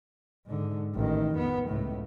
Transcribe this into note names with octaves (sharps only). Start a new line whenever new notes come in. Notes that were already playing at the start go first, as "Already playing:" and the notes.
G#2 D3
A1 D#3
F2 B3
C#2 A2